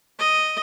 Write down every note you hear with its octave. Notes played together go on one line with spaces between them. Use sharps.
D#5